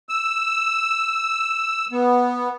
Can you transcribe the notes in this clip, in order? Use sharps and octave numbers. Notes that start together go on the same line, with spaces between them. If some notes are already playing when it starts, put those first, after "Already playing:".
E6
B3